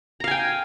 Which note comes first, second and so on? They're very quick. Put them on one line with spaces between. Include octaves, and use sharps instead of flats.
A#5 F5 G#5 G5